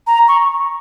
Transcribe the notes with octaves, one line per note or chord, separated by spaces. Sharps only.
A#5
C#6